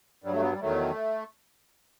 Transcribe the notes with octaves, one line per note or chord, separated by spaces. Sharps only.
G2 F#3 G3
A3
B3
G3
E2 D#3 F#3 A3